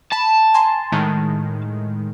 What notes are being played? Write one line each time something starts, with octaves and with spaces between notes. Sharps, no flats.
A5 B5
G#5 A#5 C6
A2 D#3 G#3